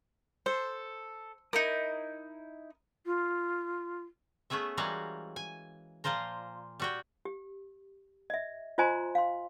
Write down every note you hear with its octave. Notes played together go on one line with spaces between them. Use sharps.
A4 C5
D#4 E4 A#4 D#6
F4
A3 B3 C#4 G#4 E5
E3 G3 G#3 F#4 A#4 F5
G#5
A#2 F3 F4 A#4 C5 A#5
G3 F#4 G5
G4
D#5 E5
F4 C5 D#5 G#5 A#5 C6
F5 C6